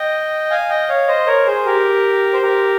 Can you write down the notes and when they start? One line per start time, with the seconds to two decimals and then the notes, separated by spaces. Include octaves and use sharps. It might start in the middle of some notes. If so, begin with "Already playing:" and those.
Already playing: D#5 G5
0.50 F5 G#5
0.69 D#5 G5
0.88 C#5 F5
1.08 C5 D#5
1.26 A#4 C#5
1.46 G#4 C5
1.66 G4 A#4
2.33 C5
2.42 G4 A#4